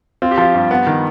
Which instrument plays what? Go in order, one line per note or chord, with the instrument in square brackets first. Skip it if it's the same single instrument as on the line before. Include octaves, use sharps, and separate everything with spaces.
[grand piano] C4 F4
G4
F3 F4
G2
B3
D#3